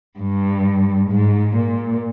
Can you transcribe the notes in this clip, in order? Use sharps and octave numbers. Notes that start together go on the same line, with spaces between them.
G2
G#2
A#2